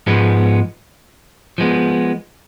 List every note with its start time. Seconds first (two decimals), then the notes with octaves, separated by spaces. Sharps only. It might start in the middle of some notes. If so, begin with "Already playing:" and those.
0.07 G#2 F3 G#3 B3
1.58 F3 G#3 B3